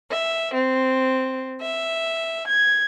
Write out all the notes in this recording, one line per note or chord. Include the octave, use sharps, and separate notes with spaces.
E5
C4
E5
G#6